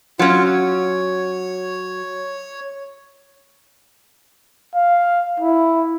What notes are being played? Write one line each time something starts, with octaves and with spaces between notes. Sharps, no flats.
F#3 C#4 F4
C#5
F5
E4